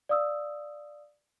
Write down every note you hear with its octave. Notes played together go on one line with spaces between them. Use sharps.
D5 F5 D#6 E6